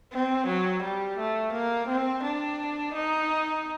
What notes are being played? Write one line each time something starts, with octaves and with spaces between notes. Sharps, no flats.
C4
F#3
G3
A3
A#3
C4
D4
D#4